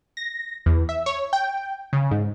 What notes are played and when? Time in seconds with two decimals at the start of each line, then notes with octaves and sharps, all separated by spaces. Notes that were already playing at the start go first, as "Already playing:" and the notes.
0.17 A#6
0.66 E2
0.89 E5
1.06 C#5
1.33 G5
1.93 C#3
2.11 G#2